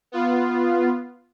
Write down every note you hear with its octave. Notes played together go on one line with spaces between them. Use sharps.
B3 F4